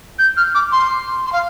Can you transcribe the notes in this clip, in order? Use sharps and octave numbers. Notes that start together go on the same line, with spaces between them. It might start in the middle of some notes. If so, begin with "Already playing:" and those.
G6
F6
D6
C6
C6
F5